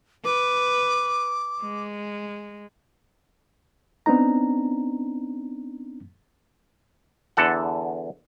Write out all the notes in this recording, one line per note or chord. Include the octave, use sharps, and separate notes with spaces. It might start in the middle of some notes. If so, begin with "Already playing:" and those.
B4 D6
G#3
B3 C4 D4 D#4 A#5
E2 D3 A4 F#5